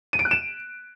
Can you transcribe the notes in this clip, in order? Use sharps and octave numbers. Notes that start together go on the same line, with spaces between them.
D#7
D7
F#6
E7